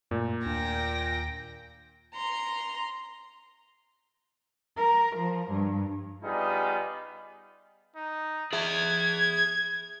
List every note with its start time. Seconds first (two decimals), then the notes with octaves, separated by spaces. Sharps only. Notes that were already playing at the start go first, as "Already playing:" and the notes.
0.11 F#2 A#2 A3
0.46 D#2 D4 G5 A#6
2.15 A#5 C6
4.77 A#4
5.15 F3
5.50 G2
6.24 G3 B3 D#4 F4 G#4 D#5
7.96 D#4
8.53 G#4 E5 G#6